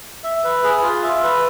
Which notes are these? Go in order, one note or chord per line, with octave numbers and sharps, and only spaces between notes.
E5
B4
G#4
F4
E5
B4